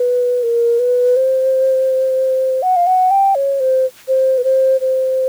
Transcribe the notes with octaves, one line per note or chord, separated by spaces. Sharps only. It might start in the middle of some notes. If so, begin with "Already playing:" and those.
Already playing: B4
A#4
B4
C5
F#5
F5
F#5
G5
C#5
C5
C5
B4
C5
C5